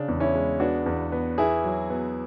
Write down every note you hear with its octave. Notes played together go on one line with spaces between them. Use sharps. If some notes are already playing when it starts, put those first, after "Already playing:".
Already playing: C#3 D4
E2
C#4 E4
G#3
B3 D4 F#4
E2
B3
B3 E4 G#4
F#3
B3